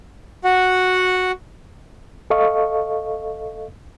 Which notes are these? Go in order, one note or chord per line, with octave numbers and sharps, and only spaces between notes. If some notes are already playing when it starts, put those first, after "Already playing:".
F#4 F#5
A4 D#5 F5 C#6